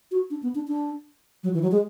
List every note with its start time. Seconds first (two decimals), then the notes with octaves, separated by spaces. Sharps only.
0.11 F#4
0.30 D4
0.43 B3
0.55 D4
0.68 D4
1.43 F#3
1.54 E3
1.62 F#3
1.72 G#3